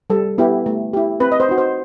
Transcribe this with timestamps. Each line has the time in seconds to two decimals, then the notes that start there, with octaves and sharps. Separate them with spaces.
0.10 G3 A4
0.38 B3 E4 G4
0.66 A3
0.93 E4 G4
1.20 C4 B4
1.32 D#5
1.40 C5
1.49 D#4 F#4
1.58 C5